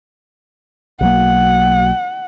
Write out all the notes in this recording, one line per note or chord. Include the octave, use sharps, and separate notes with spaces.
B1 F#3 A#3 F#5